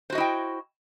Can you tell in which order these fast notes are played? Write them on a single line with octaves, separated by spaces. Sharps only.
C5 F#4 D#5 E4 G5